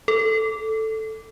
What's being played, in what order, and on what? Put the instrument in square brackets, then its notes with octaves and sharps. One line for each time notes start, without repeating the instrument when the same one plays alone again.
[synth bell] A4